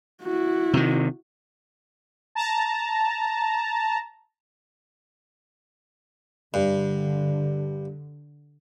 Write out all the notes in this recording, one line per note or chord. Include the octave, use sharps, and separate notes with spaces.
E4 F#4
C3 D#3
A5 A#5
G2 D3